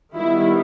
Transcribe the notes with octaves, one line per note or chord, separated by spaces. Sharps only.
D#3 G3 B3 E4